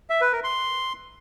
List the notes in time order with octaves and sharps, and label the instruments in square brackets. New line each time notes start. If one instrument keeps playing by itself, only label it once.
[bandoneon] E5
B4
A#4
C6